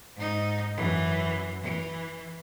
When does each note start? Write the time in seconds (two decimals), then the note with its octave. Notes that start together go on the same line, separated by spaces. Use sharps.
0.16 G#2 D#4
0.76 F#2 E3
1.62 E3